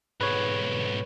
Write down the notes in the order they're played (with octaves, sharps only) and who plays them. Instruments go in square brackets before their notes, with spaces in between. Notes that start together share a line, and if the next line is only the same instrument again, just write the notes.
[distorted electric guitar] B1 G#2 [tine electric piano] B4 C#5